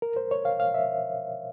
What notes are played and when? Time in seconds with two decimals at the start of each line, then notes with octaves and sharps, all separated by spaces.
0.02 A#4
0.16 C5
0.31 C#5
0.45 F5
0.60 F5
0.74 E5